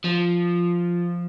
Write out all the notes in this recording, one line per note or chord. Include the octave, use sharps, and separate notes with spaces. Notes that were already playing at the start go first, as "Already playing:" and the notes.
F3